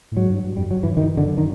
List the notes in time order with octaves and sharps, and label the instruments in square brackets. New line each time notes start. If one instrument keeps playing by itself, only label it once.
[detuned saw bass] A2
[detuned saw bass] G#2 [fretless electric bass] F#3
[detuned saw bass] G2
G2
[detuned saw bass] F2 [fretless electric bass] G3
[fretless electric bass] F#3
[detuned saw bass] G2 [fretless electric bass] E3
[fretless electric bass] D#3
[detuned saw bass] F#2 [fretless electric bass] D3
[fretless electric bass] D#3